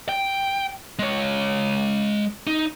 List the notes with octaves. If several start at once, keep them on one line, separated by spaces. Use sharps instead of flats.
G5
G#3 C#5
D#4